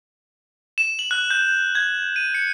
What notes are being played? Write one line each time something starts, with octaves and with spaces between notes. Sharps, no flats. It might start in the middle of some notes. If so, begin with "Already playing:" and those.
E7
F#7
F#6
G6
G#6
D#7
C#7